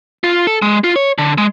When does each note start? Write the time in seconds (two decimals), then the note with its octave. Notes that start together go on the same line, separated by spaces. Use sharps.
0.24 F4
0.47 A4
0.62 G#3
0.84 F4
0.96 C#5
1.18 D3
1.38 G#3